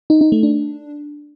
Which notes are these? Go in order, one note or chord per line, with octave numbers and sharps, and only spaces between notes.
D#4
D#4
A3
D4